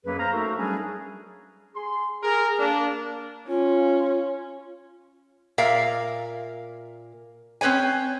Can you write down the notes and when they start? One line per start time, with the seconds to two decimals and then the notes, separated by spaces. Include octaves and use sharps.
0.04 F#2 F#3 A#3 G#4 B4
0.19 C5 F5 A#5
0.33 A3 D#4 F#4 A4 A#4
0.57 F#3 G3 C#4 D4 G#4
1.76 G#4 C6
2.23 G#4 A#4
2.59 A#3 D4
3.48 C#4 F4
5.58 A#2 A#4 E5 F5
7.61 C4 C#4 B4 C#5 G#5